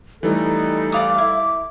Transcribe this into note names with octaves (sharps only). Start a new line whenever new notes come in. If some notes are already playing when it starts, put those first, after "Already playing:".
E3 G3 A3 D#4 A4
D5 F5 D6 D#6
E4